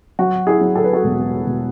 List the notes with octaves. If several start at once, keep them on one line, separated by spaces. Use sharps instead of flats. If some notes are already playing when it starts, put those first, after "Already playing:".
F#3 F#4
E4 G#4
F#3
A4
B4
F#4 A4
E1
E1